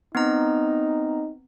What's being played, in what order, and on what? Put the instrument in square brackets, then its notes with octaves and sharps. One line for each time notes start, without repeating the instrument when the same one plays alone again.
[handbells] B3 C4 A#5 [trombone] D#4